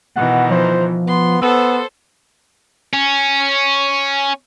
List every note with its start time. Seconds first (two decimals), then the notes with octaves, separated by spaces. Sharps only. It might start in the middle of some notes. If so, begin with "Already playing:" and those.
0.16 B2 D#3 E3 F#5
0.51 F3 C5
1.07 B3 C6
1.42 B3 A4 C5 E6
2.93 C#4